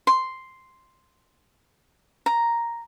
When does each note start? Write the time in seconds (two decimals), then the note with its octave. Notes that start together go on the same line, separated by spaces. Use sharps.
0.07 C6
2.26 A#5